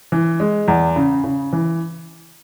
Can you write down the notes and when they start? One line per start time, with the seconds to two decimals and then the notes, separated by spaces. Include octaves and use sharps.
0.12 E3
0.40 G#3
0.68 E2
0.96 C#3
1.24 C#3
1.53 E3